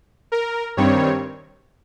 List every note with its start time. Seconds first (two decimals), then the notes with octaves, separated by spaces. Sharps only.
0.32 A#4
0.77 G2 D#3 G3 C4 C#5